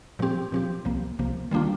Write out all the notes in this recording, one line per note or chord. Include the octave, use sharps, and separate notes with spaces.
A#2 F3 C4 G4
A#2 F3 C4 G4
C2 C3 F3 A#3
C2 C3 F3 A#3
D#3 G3 A#3 D4 F4